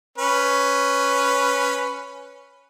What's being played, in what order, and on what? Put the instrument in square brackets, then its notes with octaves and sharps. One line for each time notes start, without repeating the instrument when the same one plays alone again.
[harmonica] C#4 B4